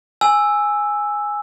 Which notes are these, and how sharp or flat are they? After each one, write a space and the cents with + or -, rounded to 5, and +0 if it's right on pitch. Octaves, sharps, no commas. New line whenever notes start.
G#5 +0 E6 +0